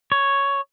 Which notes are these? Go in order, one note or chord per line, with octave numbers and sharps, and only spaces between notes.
C#5